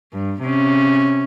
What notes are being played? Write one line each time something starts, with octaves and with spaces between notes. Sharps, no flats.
G2
C3 C#4